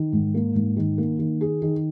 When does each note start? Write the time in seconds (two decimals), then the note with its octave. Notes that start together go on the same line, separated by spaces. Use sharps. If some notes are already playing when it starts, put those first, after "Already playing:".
Already playing: D#3
0.13 G#2
0.34 A#3
0.55 G#2
0.77 D#3
0.98 A#3
1.19 D#3
1.41 G#4
1.62 D#3